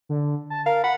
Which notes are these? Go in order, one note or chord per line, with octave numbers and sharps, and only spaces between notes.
D3
A5
A#4 F5
F#5 B5